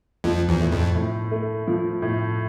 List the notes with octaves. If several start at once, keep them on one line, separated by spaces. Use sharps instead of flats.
F2 F3
E2
A2
F2
A2
A3
F3
A2